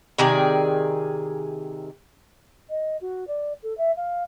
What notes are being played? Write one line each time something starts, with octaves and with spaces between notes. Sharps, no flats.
C3 D#3 G#4 D5
D#5
F#4
D5
A4
E5
F5